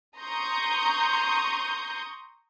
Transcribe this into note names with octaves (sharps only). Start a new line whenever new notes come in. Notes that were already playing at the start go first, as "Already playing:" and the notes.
A#5 C6 C#6 D#6 G6